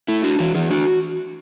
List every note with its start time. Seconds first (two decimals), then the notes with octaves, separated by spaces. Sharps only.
0.08 A3 E4
0.24 D4 F#4
0.39 E3 F#4
0.55 E3 G#4
0.70 D4 F#4